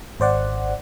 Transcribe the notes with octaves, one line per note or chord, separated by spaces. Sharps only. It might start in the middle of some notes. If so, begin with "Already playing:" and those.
G#1 C5 D5 F#5